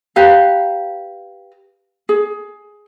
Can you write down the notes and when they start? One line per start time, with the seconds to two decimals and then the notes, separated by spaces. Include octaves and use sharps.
0.16 G4 B4 F5 A#5
2.09 G#4